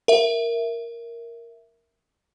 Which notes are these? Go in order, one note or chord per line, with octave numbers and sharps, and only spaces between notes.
A#4 E5